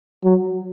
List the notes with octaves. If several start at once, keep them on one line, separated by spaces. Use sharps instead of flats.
F#3